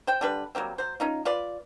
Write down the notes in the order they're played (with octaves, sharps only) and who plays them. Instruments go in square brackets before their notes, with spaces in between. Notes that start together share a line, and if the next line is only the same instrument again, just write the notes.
[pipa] C5 G5
D3 G3 B4
F#3 G3 A#3 C4
F#3 C5
C#4 D#4 F4
F4 B4 D5